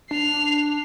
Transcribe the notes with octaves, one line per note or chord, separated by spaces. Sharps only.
D4 C7 F7